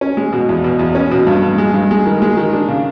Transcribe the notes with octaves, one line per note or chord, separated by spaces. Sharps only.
C#4
G#3
B2
E2
B2
E2
C#4
B2
G2
G2
G#3
G2
G#3
D#3
G#3
D#3
D4
C#3